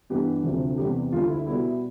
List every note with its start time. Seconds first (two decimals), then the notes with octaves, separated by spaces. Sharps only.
0.10 G2 E3 G3 B3 G4
0.44 D2 C3 F3 A3
0.78 E2 C3 G3 B3 G4
1.12 D2 D3 G3 F4
1.29 E4
1.46 B2 G3 B3 E4